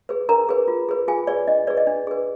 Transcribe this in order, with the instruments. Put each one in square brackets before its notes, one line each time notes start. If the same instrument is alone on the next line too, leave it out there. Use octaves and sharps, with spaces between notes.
[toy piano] G#4 B4
D4 A#4 A#5
G#4 B4
F4
G#4 B4
F4 G#4 G#5
G#4 B4 D5
D4 D#5
G#4 B4 D5
D#5
D4
G#4 B4